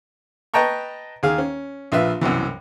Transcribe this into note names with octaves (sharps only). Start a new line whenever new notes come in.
B4 D#5 G5 A5 A#5 C#6
D#2 G#4 F5
C#4
A#1 F4 B4 E5
C2 F#2 B2 E3